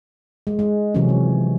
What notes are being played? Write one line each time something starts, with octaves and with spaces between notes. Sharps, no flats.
G#3
G#3
C3 E3 F#3 G#3 C#4
F3